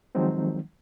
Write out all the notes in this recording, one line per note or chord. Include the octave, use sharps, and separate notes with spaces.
D#3 F3 F#3 G#3 C4 D#4